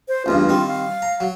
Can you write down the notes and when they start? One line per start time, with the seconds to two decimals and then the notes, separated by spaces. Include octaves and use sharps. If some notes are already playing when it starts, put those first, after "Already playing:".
0.08 C5
0.26 A1 E2 G2 F4
0.49 D#3 G3 C4
0.67 F5
1.02 A#5
1.20 F#3